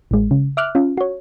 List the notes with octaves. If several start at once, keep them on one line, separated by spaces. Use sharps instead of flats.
A1 G#3
C#3
E5 D6 F6 F#6
C#4 F4
F#4 C#5